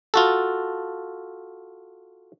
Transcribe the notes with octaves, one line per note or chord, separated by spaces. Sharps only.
F4 F#4 A4